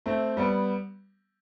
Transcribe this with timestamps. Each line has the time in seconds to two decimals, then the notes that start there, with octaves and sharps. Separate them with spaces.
0.06 A3 C4
0.37 G3 B3